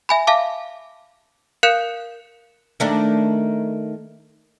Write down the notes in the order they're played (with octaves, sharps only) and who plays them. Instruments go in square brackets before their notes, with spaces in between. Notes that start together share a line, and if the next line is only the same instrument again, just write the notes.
[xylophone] E5 G#5 B5
E5 F5 A5 D6
A#4 F5 F#6 G6 C#7 E7
[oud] D#3 A3 D4